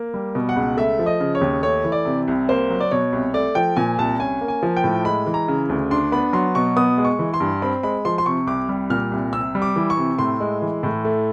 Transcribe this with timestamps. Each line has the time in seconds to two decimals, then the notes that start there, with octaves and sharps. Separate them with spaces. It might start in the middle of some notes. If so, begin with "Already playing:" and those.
Already playing: A#3
0.14 G3
0.35 B2
0.49 F#5
0.56 C#2
0.77 A3 E5
0.99 F3
1.06 D#5
1.20 C#3
1.35 C#5
1.41 D#2
1.63 A3 C#5
1.84 E3
1.92 D5
2.05 C3
2.28 C2
2.49 A#3 C5
2.70 F#3
2.80 D5
2.91 B2 C#5
3.13 C2
3.34 A3 D5
3.55 F3 G5
3.76 A#2 G#5
3.98 C2 A5
4.20 C#4 G#5
4.41 A#3
4.48 G#5
4.63 F3
4.77 G5
4.84 A2
5.05 G#3 B5
5.27 E3
5.34 A#5
5.48 C#3
5.69 D2
5.91 D4 C6
6.12 B3 B5
6.33 F#3 C6
6.55 B2 C#6
6.76 B3 D#6
6.98 G#3
7.05 C#6
7.19 E3
7.34 C6
7.40 G2
7.62 C4 B5
7.83 G#3 B5
8.05 F3 C6
8.18 C6
8.26 C3 C#6
8.47 C2 D6
8.69 G3
8.90 A#2 F6
9.12 C2
9.33 C3 E6
9.55 G3
9.62 D6
9.76 E3
9.90 C#6
9.97 C3
10.19 A2 C6
10.40 G#3
10.62 E3
10.83 A2
11.05 A3